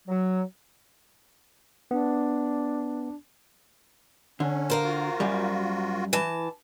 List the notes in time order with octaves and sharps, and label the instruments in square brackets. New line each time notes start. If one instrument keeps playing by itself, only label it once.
[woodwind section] F#3
[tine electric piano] B3 [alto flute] D4
[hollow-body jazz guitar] D3 [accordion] C#4
[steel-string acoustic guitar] A#3 A#4 C5
[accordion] F4 F#4
[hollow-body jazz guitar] F#2 G3
[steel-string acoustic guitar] E3 A5